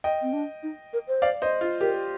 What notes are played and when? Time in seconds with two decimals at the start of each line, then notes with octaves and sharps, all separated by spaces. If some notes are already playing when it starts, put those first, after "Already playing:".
0.04 D#5 G5
0.22 C4
0.33 D4
0.63 D#4
0.93 A#4
1.08 C5
1.22 D5 F5
1.42 C5 D#5
1.61 F4
1.81 G4 A#4